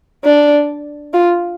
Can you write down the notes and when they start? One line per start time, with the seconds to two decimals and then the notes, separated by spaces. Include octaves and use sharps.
0.24 D4
1.14 F4